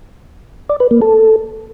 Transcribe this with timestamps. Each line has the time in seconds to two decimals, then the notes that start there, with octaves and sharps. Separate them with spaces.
0.69 D5
0.80 B4
0.91 A#3
1.02 A4